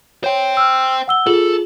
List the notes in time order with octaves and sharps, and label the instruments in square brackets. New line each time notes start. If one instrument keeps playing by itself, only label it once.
[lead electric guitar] C5 G5 [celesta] C#5
[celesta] E6 F6
F#5 E6 G7
[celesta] F4 G#4 F#7 [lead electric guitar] A4